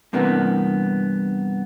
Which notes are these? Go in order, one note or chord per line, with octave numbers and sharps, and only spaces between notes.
G2 C3 E3 A#3 B3